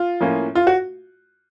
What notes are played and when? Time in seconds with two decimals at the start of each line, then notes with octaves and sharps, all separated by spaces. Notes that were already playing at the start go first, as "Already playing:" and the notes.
Already playing: F4
0.21 A2 F3 A#3 C#4
0.55 F4
0.67 F#4